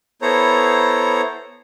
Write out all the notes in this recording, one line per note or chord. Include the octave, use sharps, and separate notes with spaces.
B3 E4 A4 C5 C#5 A#5